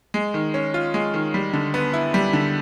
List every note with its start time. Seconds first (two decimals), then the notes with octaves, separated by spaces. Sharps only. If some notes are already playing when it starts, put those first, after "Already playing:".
0.14 G#3
0.34 D#3
0.54 C#4
0.74 F4
0.94 G#3
1.14 D#3
1.34 G3
1.53 D3
1.74 B3
1.94 E4
2.14 G3
2.33 D3